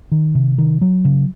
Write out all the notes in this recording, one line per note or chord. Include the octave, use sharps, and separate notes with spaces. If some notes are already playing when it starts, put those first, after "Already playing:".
D#3
C3
D#3
F#3
C#3